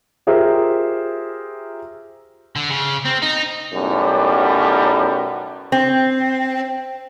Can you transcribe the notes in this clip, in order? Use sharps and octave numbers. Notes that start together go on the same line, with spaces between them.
F4 G4 G#4 A#4 C5 E5
D3
C#3
C4
D#4
B1 F#2 A2 G3
C4